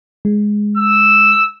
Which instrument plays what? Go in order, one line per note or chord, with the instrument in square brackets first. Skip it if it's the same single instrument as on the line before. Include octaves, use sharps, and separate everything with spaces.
[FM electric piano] G#3
[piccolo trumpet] E6